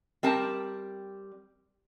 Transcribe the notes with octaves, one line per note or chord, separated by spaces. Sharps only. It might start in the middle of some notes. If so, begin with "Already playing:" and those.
G3 C4 A#4 A5